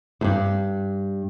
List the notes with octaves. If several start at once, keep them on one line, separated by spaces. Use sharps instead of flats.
E2 G2